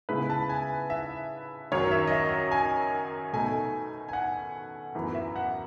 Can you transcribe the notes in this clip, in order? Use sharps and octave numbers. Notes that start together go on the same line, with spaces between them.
C#3 G#3 B3 E4 B4
A5
G#5
E5
F#2 D#3 F#3 C#5
E5
D#5
E5
G#5
B2 A3 D#4 G#5
G#5
F#5
F#2 E3 B3
E5
F#5